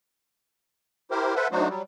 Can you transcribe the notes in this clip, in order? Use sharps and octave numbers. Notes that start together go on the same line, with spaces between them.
E4 G4 A#4 C5
A4 B4 C5 E5 F#5
F#3 A3 D4 D#4 F#4 C5
F#3 G3